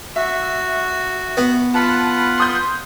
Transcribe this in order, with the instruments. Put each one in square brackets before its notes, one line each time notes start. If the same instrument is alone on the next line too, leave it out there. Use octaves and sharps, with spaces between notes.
[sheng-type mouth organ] F#4 [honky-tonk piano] E5
[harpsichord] B3
[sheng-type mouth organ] F4 B4 F#5 [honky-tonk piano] A5 B5
[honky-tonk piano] C6 D#6 G6